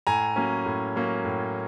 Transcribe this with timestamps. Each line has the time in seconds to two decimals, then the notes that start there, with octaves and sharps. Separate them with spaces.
0.07 A2 G#5 A#5
0.36 F#3 A#3 C#4
0.66 A2
0.96 F#3 A#3 C#4
1.25 A2